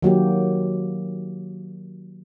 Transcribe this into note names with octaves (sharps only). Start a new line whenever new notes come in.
D#3 F#3 A#3 G4